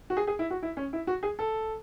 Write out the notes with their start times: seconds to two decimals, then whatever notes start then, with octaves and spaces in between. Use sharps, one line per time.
0.10 F#4
0.17 G#4
0.27 G#4
0.39 E4
0.50 F#4
0.63 E4
0.77 C#4
0.93 E4
1.07 F#4
1.23 G#4
1.39 A4